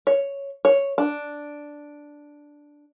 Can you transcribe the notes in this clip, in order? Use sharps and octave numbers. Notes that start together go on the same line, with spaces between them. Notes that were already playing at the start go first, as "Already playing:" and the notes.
C#5
C#5
D4